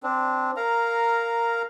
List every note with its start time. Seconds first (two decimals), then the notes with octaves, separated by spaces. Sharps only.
0.03 C4 D4
0.57 A#4 F5 A#5